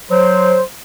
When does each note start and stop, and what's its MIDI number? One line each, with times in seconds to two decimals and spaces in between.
0.11 0.59 54
0.11 0.62 72